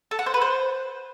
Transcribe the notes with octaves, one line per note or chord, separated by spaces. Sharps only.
A4
F#5
C5
B4
C5